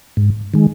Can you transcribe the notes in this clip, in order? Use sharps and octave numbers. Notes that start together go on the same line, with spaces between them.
G#2
D#3 G#3